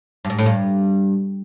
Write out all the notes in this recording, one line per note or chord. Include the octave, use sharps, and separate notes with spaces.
G2
G#2
A2
G2